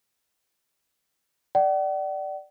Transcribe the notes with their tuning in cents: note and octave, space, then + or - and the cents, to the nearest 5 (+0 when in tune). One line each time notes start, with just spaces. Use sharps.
D5 +10 F#5 +45